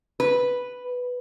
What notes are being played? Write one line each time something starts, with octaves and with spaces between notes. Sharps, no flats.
B4